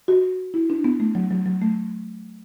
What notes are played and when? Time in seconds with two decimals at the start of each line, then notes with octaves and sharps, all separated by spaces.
0.08 F#4
0.54 E4
0.70 D4
0.84 B3
1.00 A3
1.15 F#3
1.31 F#3
1.46 F#3
1.62 A3